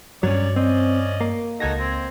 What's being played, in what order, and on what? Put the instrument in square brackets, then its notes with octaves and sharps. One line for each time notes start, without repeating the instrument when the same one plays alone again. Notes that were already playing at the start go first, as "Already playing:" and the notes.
[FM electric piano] G2 [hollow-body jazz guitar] F#3 C#4 [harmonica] C#5 D5
[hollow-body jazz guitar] C4 [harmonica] C#4 D5 D#5
[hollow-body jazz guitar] A#3
[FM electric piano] C#2 G#6 A#6 [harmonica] D#4 F#4 A4
[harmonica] C4